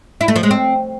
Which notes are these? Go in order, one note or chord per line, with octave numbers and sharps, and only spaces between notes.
E4
A3
F3
G#3
C4